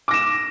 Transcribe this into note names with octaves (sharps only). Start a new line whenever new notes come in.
D6 A#6 E7